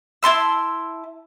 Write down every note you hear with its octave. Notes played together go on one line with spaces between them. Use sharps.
E4 A5 C6 E6